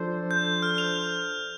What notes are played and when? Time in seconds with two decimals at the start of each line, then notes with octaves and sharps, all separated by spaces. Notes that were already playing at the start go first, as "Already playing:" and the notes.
Already playing: F3 D4 A4 C5
0.31 G6
0.62 F6
0.78 F7